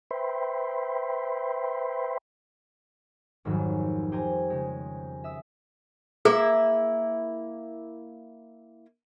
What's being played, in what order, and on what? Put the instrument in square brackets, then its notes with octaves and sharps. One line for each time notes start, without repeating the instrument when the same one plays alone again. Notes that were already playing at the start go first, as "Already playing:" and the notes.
[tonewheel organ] B4 C5 E5 G5 B5 C6
[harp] G#1 F2 G#2 D#3 F#3 G3
G4 C5 G5 G#5 A#5
C#3 G#3
E5 D#6 E6
[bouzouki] A#3 E4 E5 [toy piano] G#4